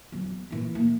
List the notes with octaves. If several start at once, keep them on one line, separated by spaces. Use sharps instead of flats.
E2 F#3
A#1 E3
A#3